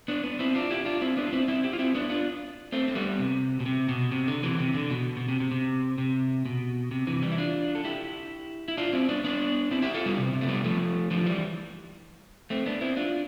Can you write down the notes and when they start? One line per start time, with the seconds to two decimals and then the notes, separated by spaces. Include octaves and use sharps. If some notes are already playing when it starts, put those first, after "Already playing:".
0.08 B3 D4
0.24 B3 D4
0.39 C4 E4
0.55 D4 F4
0.70 E4 G4
0.86 D4 F4
1.01 C4 E4
1.17 B3 D4
1.27 F4
1.33 C4 E4
1.48 C4 E4
1.64 E4 G4
1.73 F4
1.79 C4 E4
1.95 B3 D4
2.10 D4 F4
2.72 A3 C4
2.88 C4
2.95 G3 B3
3.19 C3
3.60 B2
3.66 C3
3.89 B2
4.12 C3
4.28 D3
4.43 C3 E3
4.59 C3
4.74 D3
4.90 B2
5.17 B2
5.28 C3
5.40 C3
5.51 C3
5.98 C3
6.45 B2
6.91 C3
7.07 C3 E3
7.22 E3 G3
7.31 E4
7.38 D4 F4
7.75 A4
7.84 E4 G4
8.68 E4
8.77 D4 F4
8.93 C4 E4
9.09 B3 D4
9.24 B3 D4
9.71 C4 E4
9.82 E4 G4
9.94 F4 A4
10.06 G3 B3
10.18 C3
10.33 C3
10.41 A3
10.48 G3 B3
10.64 F3 A3
11.11 D3 F3
11.26 E3 G3
12.50 A3 C4
12.66 B3 D4
12.81 C4 E4
12.97 D4 F4